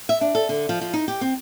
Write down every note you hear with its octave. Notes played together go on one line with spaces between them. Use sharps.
E5
D4
A4
D3
F3
F3
D#4
G4
C4